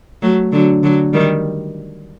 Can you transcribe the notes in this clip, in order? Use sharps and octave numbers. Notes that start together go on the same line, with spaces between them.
F#3 A3
D3 F#3
D3 F#3
D#3 G3